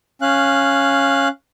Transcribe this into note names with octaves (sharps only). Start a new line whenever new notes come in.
C#4 F5 F#6